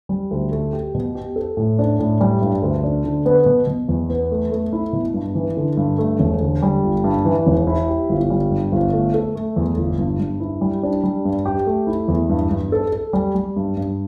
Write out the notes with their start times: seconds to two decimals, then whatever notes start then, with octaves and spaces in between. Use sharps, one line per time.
0.09 G3
0.31 D2
0.52 A3
0.73 G4
0.95 B2
1.15 G4
1.36 A4
1.57 A2
1.79 D4
1.99 A2
2.21 G3
2.42 G2
2.62 D2
2.83 D4
3.05 D3
3.26 B3
3.46 B2
3.67 B2
3.89 E2
4.09 B3
4.31 A3
4.51 A3
4.73 E4
4.93 B2
5.14 G2
5.35 E3
5.57 D3
5.77 G2
5.98 A3
6.19 E1
6.41 D3
6.62 G3
6.83 G1
7.04 G2
7.25 E3
7.47 E1
7.67 E4
7.88 G4
8.09 G1
8.30 G3
8.51 G2
8.72 G1
8.93 A3
9.14 A4
9.35 A3
9.56 E2
9.77 G1
9.99 G2
10.19 G2
10.40 E4
10.61 G3
10.83 D4
11.03 G3
11.25 G2
11.46 G4
11.66 A3
11.87 E4
12.08 E2
12.29 G2
12.51 G2
12.72 A4
12.92 A4
13.13 G3
13.35 G3
13.56 G2
13.77 G2